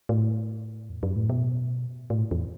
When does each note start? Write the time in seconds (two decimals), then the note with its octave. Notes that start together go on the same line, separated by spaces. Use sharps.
0.09 A2
0.90 E2
1.03 F#2
1.16 A2
1.30 B2
2.10 A2
2.31 E2